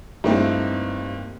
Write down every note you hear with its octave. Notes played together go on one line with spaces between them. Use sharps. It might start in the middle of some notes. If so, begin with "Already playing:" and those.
G2 A3 A#3 C4 D#4 E4